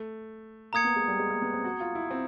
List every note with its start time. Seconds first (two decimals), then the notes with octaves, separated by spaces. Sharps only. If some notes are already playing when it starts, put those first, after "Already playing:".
Already playing: A3
0.73 A#3 A#5 D#6 G#6 C#7
0.84 B3
0.96 G#3
1.08 G3
1.19 G#3
1.30 A#3
1.42 B3
1.54 C4
1.64 F#4
1.80 F4
1.95 E4
2.11 C4